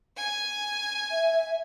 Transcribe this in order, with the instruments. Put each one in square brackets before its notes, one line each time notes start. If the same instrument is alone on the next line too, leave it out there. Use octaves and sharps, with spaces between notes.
[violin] G#5
[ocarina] E5